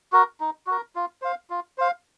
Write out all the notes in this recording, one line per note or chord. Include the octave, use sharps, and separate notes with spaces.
F#4 A#4
D#4
F#4 A#4
F4
C5 F5
F4
C5 F5